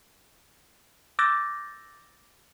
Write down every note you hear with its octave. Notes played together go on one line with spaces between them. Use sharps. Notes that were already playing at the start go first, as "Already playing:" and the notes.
D6 E6 F#6 G6 A6 A#6